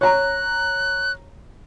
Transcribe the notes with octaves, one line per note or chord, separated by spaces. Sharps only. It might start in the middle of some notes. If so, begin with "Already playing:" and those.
C#5 A#5 F#6